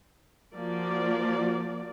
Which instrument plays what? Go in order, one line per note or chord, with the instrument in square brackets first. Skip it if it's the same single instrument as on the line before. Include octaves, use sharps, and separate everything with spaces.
[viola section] F3 A#3 F#4 D5